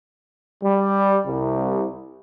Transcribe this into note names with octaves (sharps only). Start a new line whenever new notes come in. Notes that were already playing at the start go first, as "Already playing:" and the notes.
G3
C2